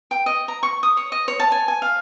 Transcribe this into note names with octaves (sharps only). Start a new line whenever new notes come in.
G5
D#5
A#5
C#6
D#6
C#5
D#5
C#5
A5
G#5
G#5
F5